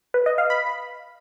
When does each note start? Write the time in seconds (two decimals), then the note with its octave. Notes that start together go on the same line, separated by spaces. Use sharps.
0.14 B4
0.26 D#5
0.38 F5
0.50 B5